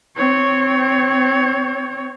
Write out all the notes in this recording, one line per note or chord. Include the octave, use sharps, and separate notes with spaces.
C4 C#5